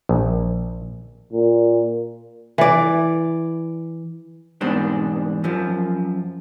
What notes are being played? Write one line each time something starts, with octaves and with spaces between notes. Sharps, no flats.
A#1
A#2
E3 D5
E2 G#2 B2 G3 C4 D4
F#2 F3